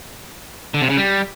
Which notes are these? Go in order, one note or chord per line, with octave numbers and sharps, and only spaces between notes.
D3
C3
C#3
G3